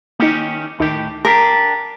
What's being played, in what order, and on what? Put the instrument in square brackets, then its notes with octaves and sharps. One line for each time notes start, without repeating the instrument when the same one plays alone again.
[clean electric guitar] D#3 C#4 G4 [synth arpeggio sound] A#3 D#4
[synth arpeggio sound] D2 D#3 [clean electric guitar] A2 G4
[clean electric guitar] D4 G4 [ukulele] A#4